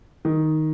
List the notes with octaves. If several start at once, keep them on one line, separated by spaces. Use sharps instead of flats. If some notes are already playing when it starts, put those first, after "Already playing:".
D#3